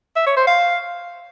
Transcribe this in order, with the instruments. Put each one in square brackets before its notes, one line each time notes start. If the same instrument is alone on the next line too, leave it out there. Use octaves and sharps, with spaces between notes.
[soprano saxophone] E5
C#5
C5
F5